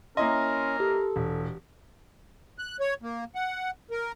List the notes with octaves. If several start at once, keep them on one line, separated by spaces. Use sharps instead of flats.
A#3 C#4 E4 A#4 D#5 C6
G4 A4
E1
F#6
C#5
A#3
F#5
A#4